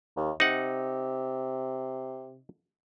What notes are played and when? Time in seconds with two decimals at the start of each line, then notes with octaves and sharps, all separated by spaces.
0.17 D#2
0.40 C3 D#4 F#5